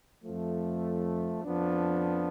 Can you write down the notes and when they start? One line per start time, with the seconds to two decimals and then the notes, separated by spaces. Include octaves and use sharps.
0.25 F2 F3 A3
1.45 F2 F3 B3 D4